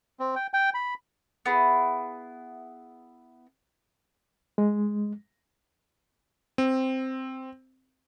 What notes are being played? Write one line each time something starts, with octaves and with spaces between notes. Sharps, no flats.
C4
G5
G5
B5
B3 E4 G#4
G#3
C4